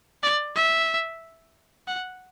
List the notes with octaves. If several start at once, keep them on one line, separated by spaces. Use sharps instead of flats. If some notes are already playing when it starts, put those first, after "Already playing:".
D5
E5
F#5